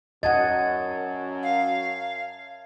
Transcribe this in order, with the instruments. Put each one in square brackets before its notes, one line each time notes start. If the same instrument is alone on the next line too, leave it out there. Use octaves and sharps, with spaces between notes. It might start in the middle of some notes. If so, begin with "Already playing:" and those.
[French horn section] F#2 [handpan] D#5 F#5 [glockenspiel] A5 G#6 A6
[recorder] F5